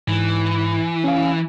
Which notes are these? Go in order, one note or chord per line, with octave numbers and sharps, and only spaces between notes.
G#2 E3
C#4 F5